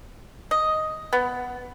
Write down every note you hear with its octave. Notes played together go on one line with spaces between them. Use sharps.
D#5
B3